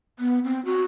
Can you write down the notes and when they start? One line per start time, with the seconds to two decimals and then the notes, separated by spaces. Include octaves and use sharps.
0.19 B3
0.44 C4
0.65 F#4